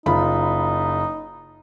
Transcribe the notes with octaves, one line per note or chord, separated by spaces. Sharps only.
F#1 D#4 F4 B5